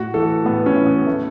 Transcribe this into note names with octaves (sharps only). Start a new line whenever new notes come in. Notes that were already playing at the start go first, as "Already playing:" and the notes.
Already playing: A2 F#4
E3 A4
A2 B3
C#4
E3
B3
A3